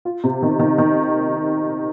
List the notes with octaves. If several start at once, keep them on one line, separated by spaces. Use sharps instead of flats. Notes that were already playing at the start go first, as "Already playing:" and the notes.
F4
C3
D#3
D#3
D#3